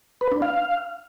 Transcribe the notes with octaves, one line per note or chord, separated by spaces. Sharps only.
B4
D4
F5